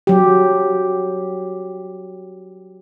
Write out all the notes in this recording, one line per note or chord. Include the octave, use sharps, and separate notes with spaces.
F#3 G4